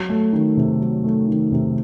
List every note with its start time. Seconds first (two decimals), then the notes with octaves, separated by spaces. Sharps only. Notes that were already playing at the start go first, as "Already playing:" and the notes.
Already playing: F#3
0.09 A3
0.33 D#3
0.57 C3
0.81 F#3
1.04 A3
1.28 D#3
1.52 C3